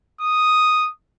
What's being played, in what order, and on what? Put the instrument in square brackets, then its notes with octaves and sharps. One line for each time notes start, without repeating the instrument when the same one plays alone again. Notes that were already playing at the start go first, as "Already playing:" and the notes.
[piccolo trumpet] D#6